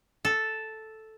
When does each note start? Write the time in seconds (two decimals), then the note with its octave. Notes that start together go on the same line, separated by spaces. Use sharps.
0.25 A4